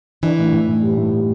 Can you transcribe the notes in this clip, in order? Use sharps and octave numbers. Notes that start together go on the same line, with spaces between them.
E3 D4
A2
A2
A2
G3
A2
G3